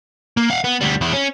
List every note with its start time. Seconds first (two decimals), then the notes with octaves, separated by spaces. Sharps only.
0.37 A#3
0.50 F5 F#5
0.64 B3
0.81 D2 G3
1.01 E2 E4
1.13 C#4